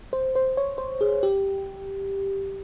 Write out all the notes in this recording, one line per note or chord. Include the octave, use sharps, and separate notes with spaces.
C5
C5
C#5
C5
G#4
G4